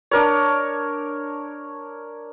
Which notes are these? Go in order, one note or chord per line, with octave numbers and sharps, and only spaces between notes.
D4 A#4 C#5